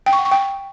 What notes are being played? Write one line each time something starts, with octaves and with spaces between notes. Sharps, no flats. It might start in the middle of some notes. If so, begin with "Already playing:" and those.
G5
C#6
F#5
C#6
G5